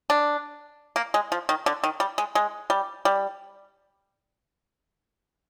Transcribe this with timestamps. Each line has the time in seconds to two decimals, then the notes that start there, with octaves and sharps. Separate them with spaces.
0.10 D4
0.96 A#3
1.14 G#3
1.32 F3
1.49 D#3
1.66 D3
1.84 D#3
2.00 G3
2.18 G#3
2.35 G#3
2.70 G3
3.05 G3